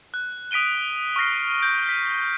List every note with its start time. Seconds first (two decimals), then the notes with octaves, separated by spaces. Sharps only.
0.14 F#6
0.51 D#6 B6 D7 D#7 G7
1.16 C#6 F6 A#6 C7
1.60 G6 D7
1.89 B6